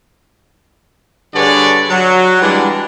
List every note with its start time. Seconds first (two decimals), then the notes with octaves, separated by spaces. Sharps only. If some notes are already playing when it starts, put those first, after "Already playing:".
1.34 G2 D3 G#4 B4 C#5 D5
1.90 F#3
2.41 E3 G3 G#3 D4